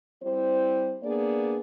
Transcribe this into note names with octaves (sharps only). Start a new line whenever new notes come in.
G3 C4 E4 C5
A#3 B3 D4 G#4 D5